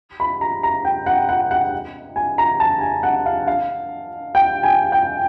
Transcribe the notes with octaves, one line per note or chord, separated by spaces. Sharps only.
B5
A#5
A#5
G5
F#5
F#5
F#5
G#5
A#5
A5
G#5
F#5
F5
F5
G5
G#5
G5